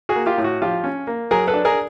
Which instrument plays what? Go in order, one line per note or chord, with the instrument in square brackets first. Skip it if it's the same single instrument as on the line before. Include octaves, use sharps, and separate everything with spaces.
[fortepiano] F#4 G#4
A#3
F4 G4
A2
F#4
F3 F4 G4
C#4
A#3
F#3 G#4 A#4
A4 B4
D4
G#4 A#4